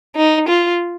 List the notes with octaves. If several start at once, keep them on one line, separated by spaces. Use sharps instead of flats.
D#4
F4